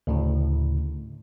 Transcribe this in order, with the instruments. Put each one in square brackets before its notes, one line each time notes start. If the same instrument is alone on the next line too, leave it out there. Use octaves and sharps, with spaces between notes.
[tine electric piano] D2 A2 C#3